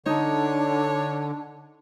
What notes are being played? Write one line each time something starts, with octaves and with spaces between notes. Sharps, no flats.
D3 D4 D#4 C#5